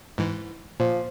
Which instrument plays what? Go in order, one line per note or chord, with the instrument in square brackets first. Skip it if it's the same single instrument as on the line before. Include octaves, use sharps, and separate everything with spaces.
[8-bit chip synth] G#2 E3
[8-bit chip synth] A#2 [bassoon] F3